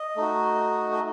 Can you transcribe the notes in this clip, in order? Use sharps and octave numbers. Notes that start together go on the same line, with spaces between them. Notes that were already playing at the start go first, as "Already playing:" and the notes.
Already playing: D#5
A3 D#4 F#4
D#5